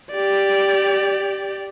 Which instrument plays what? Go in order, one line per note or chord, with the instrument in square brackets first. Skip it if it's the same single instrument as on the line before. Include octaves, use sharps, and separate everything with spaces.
[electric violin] G4 D5